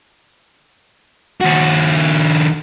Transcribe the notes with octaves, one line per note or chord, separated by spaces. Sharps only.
D#2 F#4